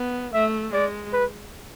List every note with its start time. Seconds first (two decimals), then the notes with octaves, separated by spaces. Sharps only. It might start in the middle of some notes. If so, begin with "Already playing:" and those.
Already playing: B3
0.33 A3 E5
0.73 G#3 D5
1.13 B4